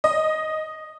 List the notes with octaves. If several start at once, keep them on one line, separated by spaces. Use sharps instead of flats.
D#5